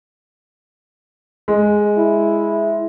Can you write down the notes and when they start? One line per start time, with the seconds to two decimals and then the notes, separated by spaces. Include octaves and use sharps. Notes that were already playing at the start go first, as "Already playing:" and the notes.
1.48 G#3
1.98 E4